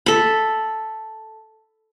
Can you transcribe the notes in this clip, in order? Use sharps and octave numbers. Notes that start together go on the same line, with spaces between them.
A4 B5